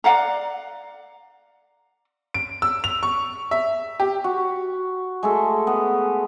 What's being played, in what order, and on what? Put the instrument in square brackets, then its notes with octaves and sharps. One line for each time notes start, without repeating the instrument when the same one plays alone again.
[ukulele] D5 F5 F#5 A#5
[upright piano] D7
E6
F7
C#6
E5
G4
[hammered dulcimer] F#4
G#3 A3 A4
B3